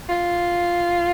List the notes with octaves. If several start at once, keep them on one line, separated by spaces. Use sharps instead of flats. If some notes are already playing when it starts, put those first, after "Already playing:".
F4